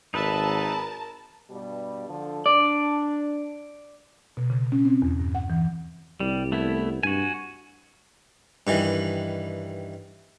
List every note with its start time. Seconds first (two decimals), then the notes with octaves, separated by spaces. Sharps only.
0.14 G#1 D#4 A#4 B4 E5 A5 B5
1.49 G2 B2 G3
2.08 D3 F3
2.46 D4 D5
4.37 B2
4.50 C#3
4.72 C#4
4.85 C4
5.02 E2
5.19 G2
5.35 F#5
5.50 E3
6.20 C2 G3
6.52 A3 B3 E4
7.03 G2 F#4 G#5
8.67 G2 D#3 E3